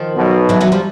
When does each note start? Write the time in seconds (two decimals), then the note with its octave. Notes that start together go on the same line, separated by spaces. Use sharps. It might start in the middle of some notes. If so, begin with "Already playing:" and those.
Already playing: D#3 F3
0.16 B1 B2
0.49 E3 F#3
0.61 E3 F#3
0.72 F3 G3